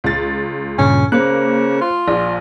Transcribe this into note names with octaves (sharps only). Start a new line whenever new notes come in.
C#2 A6
G2 A#2 C#3 C#4
C#3 A#3 C5 F#6
F4
A#1 D5